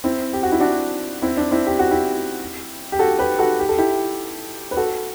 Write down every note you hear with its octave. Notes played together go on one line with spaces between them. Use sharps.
C4 E4
G4
F#4
E4
D4 F#4
C4 E4
D4
C4 E4
G4
F#4
E4 G4
G4
F#4 A4
G4 B4
F#4 A4
G4
A4
E4 G4
B4
F#4 A4